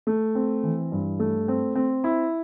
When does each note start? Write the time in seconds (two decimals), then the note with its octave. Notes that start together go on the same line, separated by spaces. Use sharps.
0.07 A3
0.35 C4
0.63 E3
0.92 G2
1.19 A3
1.48 C4
1.75 C4
2.04 E4